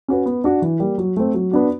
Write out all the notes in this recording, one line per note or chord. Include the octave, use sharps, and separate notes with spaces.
C#4 F#4 B4
B3
D4 F#4
E3
G3 A#3
F#3
A3 C4
F#3
B3 D4 F#4